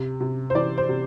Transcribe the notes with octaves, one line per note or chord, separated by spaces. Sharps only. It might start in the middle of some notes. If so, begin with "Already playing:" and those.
Already playing: C3
C3
C5
E3 D5
C5
C3